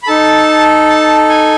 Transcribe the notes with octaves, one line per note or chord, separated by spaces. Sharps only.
B5
D#4 A4 A5
A5
G#5